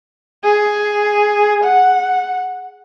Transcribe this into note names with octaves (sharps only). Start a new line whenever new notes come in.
G#4
F#5